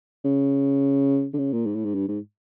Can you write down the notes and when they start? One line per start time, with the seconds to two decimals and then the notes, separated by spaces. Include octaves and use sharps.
0.25 C#3
1.34 D3
1.38 C#3
1.53 A#2
1.66 G#2
1.76 A2
1.85 G#2
1.95 G2
2.09 G#2